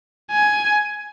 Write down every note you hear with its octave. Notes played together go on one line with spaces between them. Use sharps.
G#5